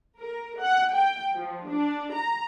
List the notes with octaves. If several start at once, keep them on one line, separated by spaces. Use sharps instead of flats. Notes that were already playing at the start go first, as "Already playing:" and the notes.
A#4
F#5
G5
F3
D4
A#5